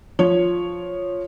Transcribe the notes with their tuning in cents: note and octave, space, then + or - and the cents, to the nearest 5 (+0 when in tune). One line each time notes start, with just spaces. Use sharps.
F3 +0 C#5 +0